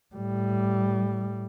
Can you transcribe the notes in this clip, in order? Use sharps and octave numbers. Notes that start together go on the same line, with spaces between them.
A2 G3